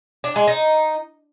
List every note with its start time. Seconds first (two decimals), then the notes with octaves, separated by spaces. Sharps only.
0.24 D4
0.36 G#3
0.48 D#4